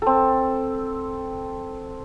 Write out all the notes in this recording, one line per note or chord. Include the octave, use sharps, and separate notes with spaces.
C4 A4